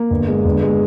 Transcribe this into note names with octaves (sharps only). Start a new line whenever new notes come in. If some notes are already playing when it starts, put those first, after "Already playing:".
Already playing: A#3
G1
G#3
G1
G#3